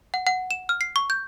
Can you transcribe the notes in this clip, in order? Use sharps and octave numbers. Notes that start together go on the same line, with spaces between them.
F#5
F#5
E7
F6
C7
C#6
G6